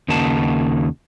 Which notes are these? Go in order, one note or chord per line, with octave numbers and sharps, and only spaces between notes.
D#2 C#3 A#3 D#4 F#4 A5